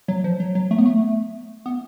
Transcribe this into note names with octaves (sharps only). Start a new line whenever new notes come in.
F#3
F3
F#3
F#3
A3
B3
A3
B3